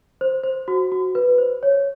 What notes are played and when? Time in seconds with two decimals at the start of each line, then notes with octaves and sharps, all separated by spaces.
0.21 C5
0.44 C5
0.68 F#4
0.92 F#4
1.15 B4
1.38 C5
1.63 C#5